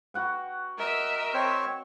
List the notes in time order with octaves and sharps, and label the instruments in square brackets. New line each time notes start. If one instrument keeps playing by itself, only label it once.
[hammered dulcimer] F#4 F#5 G5
[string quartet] A#4 D#5 E5
[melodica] C4 C5 C#5